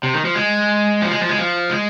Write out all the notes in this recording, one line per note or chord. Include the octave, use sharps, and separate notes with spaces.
C3
D#3
F3
G#3
F3
G#3
F3
G#3
F3
G#3